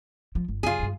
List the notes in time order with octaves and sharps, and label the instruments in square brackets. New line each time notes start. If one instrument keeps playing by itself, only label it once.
[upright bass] F3
G1
[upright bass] F#2 C#3 [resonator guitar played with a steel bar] F4 G#4
[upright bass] G2 D#3